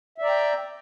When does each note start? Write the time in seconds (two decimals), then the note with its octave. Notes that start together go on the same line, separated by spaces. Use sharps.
0.18 E5
0.22 D5
0.25 A#5
0.28 G5